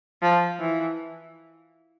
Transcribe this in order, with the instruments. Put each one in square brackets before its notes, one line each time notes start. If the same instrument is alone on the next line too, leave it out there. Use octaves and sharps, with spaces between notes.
[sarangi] F3
E3